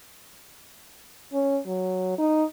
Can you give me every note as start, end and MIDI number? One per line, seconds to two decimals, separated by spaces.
1.33 1.59 61
1.66 2.16 54
2.18 2.44 63